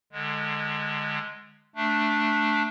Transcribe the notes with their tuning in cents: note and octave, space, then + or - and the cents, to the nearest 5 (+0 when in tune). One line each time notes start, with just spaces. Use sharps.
D3 +25 G#3 +0
A3 +0 D4 +0